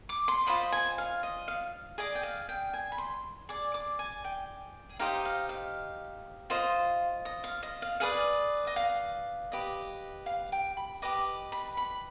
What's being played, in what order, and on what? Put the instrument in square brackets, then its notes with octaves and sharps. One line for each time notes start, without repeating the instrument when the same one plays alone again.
[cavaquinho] D6
C6
F4 C5 D#5 B5
G#5
F5
D#5
F5
G#4 D5 D#5
G5
F5
G5
G#5
B5
C6
G#4 D5 D6
D6
G#5
G5
D#4 G4 C5 D#5 F5
F5
F5
F4 C5 D#5
D#5
F5
D#5
F5
G#4 B4 D5 F5
D#5
F5
G4 B4 D#5
F5
G5
B5
G4 B4 D#5 D6
B5
B5